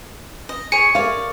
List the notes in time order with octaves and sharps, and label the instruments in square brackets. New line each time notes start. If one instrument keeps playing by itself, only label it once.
[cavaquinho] D#5
[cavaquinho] G#4 C#5 [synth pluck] C#7
[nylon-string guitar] A#4 F5 [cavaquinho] C#5 D5